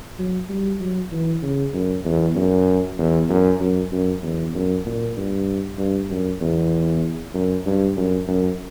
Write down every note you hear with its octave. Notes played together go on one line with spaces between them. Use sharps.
F#3
G3
F#3
E3
C#3
F#2
E2
F#2
E2
F#2
F#2
F#2
E2
F#2
A#2
G2
G2
F#2
E2
F#2
G2
F#2
F#2